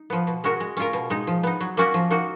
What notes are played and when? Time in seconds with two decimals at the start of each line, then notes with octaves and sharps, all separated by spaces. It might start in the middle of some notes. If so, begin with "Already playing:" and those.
Already playing: D#4
0.10 F3 B3
0.27 B2
0.44 G#3 C#4 F#4 A#4
0.60 G#3
0.77 C#4 F4 A#4
0.93 B2
1.10 G#3 D#4
1.27 F3
1.43 B3 D#4
1.60 F#3
1.77 A#3 C#4 F#4 A#4
1.94 F3
2.10 A#3 D#4 F#4